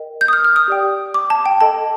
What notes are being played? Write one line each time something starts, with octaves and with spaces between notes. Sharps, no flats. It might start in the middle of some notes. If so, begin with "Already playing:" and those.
Already playing: A#4 D#5 G5
G6
D#6
F6
F6
D#6
G4 D5 G5
D6
A5
G5
A4 D#5 G5 A5